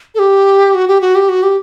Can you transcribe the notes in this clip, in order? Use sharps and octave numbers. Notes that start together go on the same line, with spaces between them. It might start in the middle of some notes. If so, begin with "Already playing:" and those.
A4
G4
F#4
G4
F#4
G4
F#4
G4